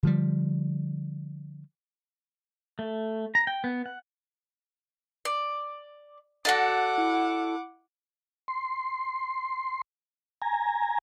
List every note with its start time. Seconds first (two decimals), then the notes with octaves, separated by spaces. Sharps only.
0.03 D3 F3 G3
2.79 A3
3.35 A#5
3.47 G5
3.64 B3
3.86 F#5
5.25 D5
6.45 F#4 A4 D5 F#5 D6
6.98 E4
8.48 C6
10.42 G#5 A#5